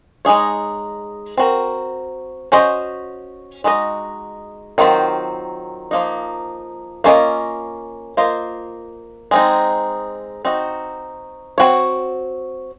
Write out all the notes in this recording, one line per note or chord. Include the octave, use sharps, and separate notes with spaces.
G#3 D#4 G#4 C#5
C4 F#4 A#4
C#4 F#4 C5 D#5
G#3 D#4 F#4 A#4 D#5
D#3 F#3 C4 F4 C5
F3 A#3 D#4
A#3 C#4 F4 C5 D#5
A#3 F4 C5 D#5
G#3 C4 D#4
C4 D#4 F#4
C4 F#4 C#5